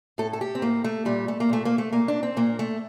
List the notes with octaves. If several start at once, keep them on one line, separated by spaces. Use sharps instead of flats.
A2 A4
A4
G4
C4
A2 A#3
A3
A#2 G3
A3
A#3
A#2 A3
A#3
A3
A#2 A#3
D4
C4
A#2 A#3
A3